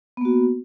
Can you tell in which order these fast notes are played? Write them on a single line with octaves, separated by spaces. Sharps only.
B3 A#3 F#4